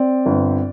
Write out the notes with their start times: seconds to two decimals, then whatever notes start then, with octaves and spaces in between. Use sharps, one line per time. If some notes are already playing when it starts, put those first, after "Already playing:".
Already playing: C4 D5
0.26 G1